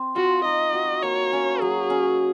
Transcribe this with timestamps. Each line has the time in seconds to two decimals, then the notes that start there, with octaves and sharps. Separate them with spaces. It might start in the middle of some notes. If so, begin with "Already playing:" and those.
Already playing: C4
0.16 F4 F#4
0.45 D#4 D#5
0.74 F#4
1.03 A#3 C#5
1.33 C#4
1.62 F#3 G#4
1.90 C#4